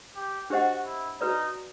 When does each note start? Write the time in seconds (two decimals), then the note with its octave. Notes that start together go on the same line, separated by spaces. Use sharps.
0.16 G4
0.50 D4 F#4 G4 C5 D#5 F#5
0.85 E4
1.20 D#4 F#4 B4 D5